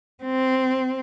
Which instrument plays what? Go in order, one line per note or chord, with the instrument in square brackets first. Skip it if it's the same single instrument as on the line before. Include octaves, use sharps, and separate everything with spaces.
[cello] C4